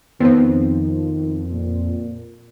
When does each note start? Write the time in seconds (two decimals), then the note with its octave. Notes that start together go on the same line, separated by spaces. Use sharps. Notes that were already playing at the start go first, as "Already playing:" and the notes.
0.20 F2 D#3 B3 C4
1.51 A#2